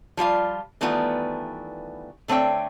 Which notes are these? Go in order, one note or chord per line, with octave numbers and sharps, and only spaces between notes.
F3 G3 F4 F5
D#3 E3 G3 A3 B3 F4
D3 A3 C4 C#5 G5